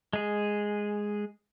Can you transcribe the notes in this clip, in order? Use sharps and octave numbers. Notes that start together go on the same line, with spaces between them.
G#3 G#4